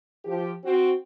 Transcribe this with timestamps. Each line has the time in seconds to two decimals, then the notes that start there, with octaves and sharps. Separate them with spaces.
0.25 F3 G4
0.63 C4 F#4